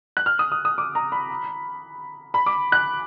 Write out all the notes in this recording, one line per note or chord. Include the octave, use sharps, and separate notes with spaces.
F#6
F6
D#6
D#6
D#6
D6
A#5
B5
B5
D6
F#6